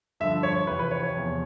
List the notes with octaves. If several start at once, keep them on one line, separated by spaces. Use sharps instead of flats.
G2 D3 F3 E5
C#5
C#5
F2 C3 E3 B4
B4
C#5
C#5
E2 C3 F3